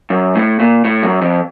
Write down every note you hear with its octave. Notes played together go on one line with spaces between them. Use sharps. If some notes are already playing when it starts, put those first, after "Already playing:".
F#2
A2
A#2
A2
F#2
F2